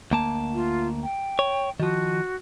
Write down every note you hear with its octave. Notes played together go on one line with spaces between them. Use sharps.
D2 A#3 A5
F4
G5
C#5
D#3 F3 F#4